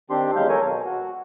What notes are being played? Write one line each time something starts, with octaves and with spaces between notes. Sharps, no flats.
D#3 C4 D4 G4 C6
E2 F#3 G#3 F5 G6
A4 A#4 C#5 G#5
B2
F#4